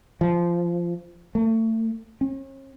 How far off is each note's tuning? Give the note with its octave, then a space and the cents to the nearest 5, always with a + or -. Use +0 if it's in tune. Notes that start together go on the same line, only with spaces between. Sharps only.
F3 -15
A3 +30
C#4 -40